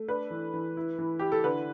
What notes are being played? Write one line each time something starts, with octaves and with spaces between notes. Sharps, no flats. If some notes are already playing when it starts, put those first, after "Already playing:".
Already playing: A3
D4 B4
E3
E3
E4
E3
E4 G4
A4
D3 B4